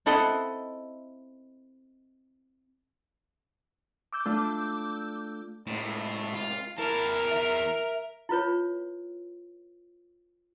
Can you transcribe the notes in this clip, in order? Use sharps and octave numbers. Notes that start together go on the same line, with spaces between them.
C4 E4 A4 D#5 F#5 C6
D6 E6 G6
A3 D4 F4
C2 A2 G#3
F4
E2 E3 A#4 A5
E5
E4 F4 B4 C#5